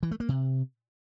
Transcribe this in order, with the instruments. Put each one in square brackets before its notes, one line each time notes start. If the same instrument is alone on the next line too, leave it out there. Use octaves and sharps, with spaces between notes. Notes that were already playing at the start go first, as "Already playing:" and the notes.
[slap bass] E3
A3
A#3
C3